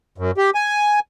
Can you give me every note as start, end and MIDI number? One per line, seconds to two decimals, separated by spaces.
0.18 0.31 42
0.37 0.50 67
0.55 1.00 80